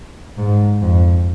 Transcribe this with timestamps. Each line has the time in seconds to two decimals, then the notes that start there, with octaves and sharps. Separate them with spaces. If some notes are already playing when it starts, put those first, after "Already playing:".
0.38 G#2
0.82 F2